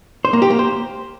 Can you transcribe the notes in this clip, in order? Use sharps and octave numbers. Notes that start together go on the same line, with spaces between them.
C5
A#3
G4
A#3
C5